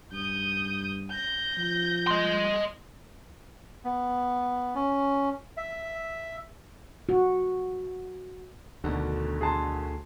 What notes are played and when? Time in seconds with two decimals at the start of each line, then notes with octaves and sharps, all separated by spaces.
0.12 G2 D#6 G6
1.10 G6 A#6
1.58 F3
2.07 D#5 C6
3.84 B3
4.75 C#4
5.57 E5
7.09 F#4
8.84 D2 B2 D3 D#3
9.41 G#4 A5 C6